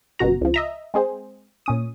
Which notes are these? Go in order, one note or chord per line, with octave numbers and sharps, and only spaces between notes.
G1 F#2 B2 F#4 A#5
C#2 F3
D#5 E5 A#5
G#3 C4 G#4 C5
A#2 C#4 D#6